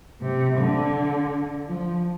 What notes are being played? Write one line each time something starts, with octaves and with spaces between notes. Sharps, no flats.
C3
D3
F3